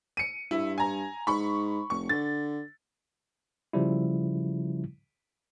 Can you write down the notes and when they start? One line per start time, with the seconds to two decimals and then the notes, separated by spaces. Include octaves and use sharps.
0.17 C#7 D#7
0.51 G2 E4
0.78 G#5 A#5
1.27 G#2 B5 C#6
1.90 F1 C#6
2.09 D3 A6
3.73 C#3 F3 G3 E4